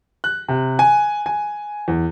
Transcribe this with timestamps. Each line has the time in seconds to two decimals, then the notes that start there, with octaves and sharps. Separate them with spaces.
0.24 F#6
0.48 C3
0.79 G#5
1.26 G#5
1.88 E2